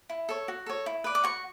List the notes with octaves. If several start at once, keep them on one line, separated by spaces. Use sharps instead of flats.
E4
A4 C#5
F#4
A4 C#5
E4
B4 D5
D6
F#4 C#6